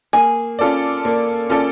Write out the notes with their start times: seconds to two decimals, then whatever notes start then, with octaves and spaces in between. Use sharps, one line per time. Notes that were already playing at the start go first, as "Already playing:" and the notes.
0.13 A#3 G#4
0.59 C#4 F4 A4 D5
1.05 A#3
1.50 C#4 F4 A4 D5